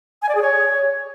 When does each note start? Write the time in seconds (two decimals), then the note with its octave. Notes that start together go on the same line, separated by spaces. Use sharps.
0.22 G#5
0.29 D5
0.35 G#4
0.42 C#5